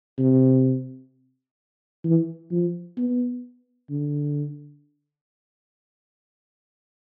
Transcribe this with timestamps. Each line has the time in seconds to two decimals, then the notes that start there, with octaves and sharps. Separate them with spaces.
0.19 C3
2.04 E3
2.51 F3
2.97 B3
3.90 D3